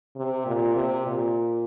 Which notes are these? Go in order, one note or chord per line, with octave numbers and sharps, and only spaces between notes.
C3
A#2
C3
A#2